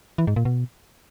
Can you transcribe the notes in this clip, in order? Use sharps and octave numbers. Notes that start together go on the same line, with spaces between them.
E3
G#2
A#2
B2